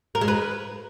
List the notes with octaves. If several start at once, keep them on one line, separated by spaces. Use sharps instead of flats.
A#4
G#3
B4